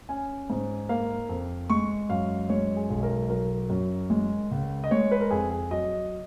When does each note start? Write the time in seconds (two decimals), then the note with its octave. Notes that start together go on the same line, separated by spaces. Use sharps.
0.09 C#4 G#5
0.50 G#2
0.89 A#3 F5
1.29 F2
1.70 G#3 C#6
2.09 F#2 F5
2.49 G#3 C#5
2.77 G#4
2.89 B1
3.03 A#4
3.30 F#3 A#4
3.70 F#2
4.10 G#3
4.51 C#2
4.84 D#5
4.91 G#3 C#5
5.11 B4
5.20 A#4
5.31 F2 G#4
5.51 G#4
5.71 F#3 D#5